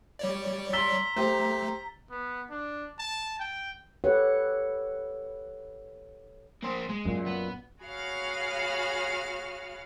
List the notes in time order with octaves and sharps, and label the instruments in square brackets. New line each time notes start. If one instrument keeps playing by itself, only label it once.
[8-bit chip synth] G3 C#5 D5
[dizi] A#5 [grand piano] C6 E6 [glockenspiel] A6 B6 G7
[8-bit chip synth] A3 [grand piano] G4 C5
[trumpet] B3
D4
A5
G5
[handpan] G4 A4 B4 C#5 F#5
[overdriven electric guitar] A#3 C5
G#3
[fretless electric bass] F#2 A#2
[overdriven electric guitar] B3
[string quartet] F#4 G#4 C#5 F5 B5 F6